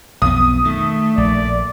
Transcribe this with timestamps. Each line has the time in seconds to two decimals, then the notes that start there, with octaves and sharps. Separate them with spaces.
0.22 B1 F2 B3 D#6
0.65 D#3 A3
1.18 A#1 D5